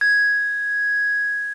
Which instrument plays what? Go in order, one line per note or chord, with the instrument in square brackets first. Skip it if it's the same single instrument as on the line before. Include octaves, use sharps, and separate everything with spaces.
[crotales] G#6